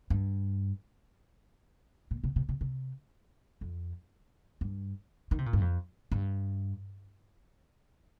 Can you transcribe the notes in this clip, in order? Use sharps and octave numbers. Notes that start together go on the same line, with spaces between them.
G2
A#2
C3
C3
C3
C3
F2
G2
D#3
C3
A#2
G2
F2
G2